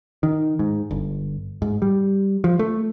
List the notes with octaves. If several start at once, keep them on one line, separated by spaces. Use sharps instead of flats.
D#3
G#2
G1
G#2
G3
F3
A3